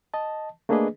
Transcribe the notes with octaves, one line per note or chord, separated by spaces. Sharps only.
D#5 A5
A3 A#3 D4 G#4 B4 D#5